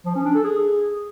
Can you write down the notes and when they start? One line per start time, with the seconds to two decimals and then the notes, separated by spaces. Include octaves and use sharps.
0.06 F3
0.15 C#4
0.25 D4
0.35 A4
0.44 G#4